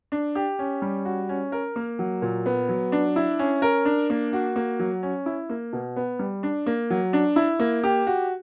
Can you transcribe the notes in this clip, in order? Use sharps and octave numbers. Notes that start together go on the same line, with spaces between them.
D4
G4
C#4
G3
F#4
C#4
A#4
A#3
F#3
A#2
B3
F#3
D4
E4
C#4
A#4
D4
A#3
F#4
A#3
F#3
C#4
E4
A#3
B2
B3
G3
D4
A#3
F#3
D4
E4
A#3
G4
F#4